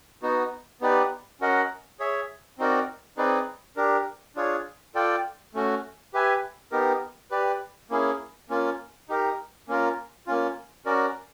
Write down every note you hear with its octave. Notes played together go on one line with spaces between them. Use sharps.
B3 D#4 F#4
B3 D#4 G4 B4 D5
C#4 F#4 A#4 D#5 F#5
G#4 C#5 E5
C4 D#4 F#4 A#4 D5
C4 D#4 G#4 B4 D5
D4 G4 A#4
D4 F4 G#4 C#5
F4 A4 D5 G5
A3 C#4 F#4
G4 B4 E5 G#5
B3 D#4 G4 A#4
G4 B4 D5
A#3 C#4 E4 G#4
A#3 C#4 F4
D#4 G4 A#4
A#3 C#4 F4 A#4
A#3 C#4 F4
C#4 F#4 A#4 D5